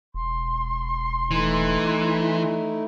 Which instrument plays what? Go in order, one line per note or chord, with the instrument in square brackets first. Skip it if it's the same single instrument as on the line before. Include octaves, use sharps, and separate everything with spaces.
[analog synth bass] E1 [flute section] C6
[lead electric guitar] E3 [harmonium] A3 D#4 E4